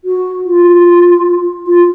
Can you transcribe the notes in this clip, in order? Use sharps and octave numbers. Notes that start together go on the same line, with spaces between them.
F#4
F4
F4